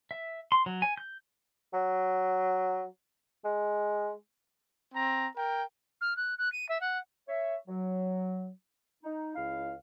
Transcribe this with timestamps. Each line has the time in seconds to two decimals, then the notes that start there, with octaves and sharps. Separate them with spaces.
0.11 E5
0.52 C6
0.66 F#3
0.82 G#5
0.97 G6
1.73 F#3
3.45 G#3
4.93 C4 A#5
5.36 A#4 G5
6.01 F6
6.16 F#6
6.38 F#6
6.52 D#7
6.68 E5
6.80 F#5
7.28 C#5 E5
7.68 F#3
9.03 D#4
9.35 C#2 E4 F5